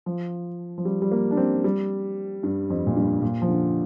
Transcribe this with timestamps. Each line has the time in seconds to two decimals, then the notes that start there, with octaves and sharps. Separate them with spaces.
0.06 F3
0.78 F3
0.85 G3
1.02 G3
1.11 A#3
1.31 D4
1.37 C4
1.64 G3
2.43 G2
2.70 F2
2.87 A#2
2.96 G2
3.22 A#2
3.42 F3
3.48 D3